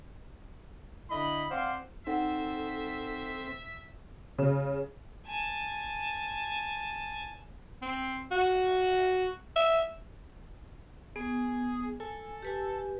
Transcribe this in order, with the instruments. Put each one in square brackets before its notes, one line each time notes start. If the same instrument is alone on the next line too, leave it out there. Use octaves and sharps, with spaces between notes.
[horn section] D3 E4 D#5 B5
C4 C5 D5 F5 F#5
[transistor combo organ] C4 [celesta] D#4 F#5 [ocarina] A4 [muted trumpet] E5
[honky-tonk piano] C#3
[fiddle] G#5 A5
[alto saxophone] C4
F#4
E5
[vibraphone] B3 [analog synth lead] G#4
[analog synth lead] A4 [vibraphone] G#5
[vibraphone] G4 B4 G#5